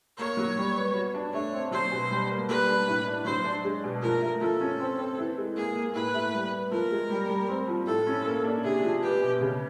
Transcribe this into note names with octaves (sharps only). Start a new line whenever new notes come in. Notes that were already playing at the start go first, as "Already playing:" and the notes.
A#3 C#5
F#3
G3
B3
F#4
D4
A3 C#5
C4
F#3 C5
B2
G3
A#3
G3 B4
D4
A2
D4
F#3 C5
D4
G#3
B2
F3 A#4
A3
F3 A4
C#4
C4
C4
E3
G#3
A#3 G#4
A#3
A2 B4
A3
G3
B3
F3 A#4
G#3
G3
G3
C4
F3
A2 A4
C#4
A#3
D4
C3 G#4
F3
B3 G4
B2
C#3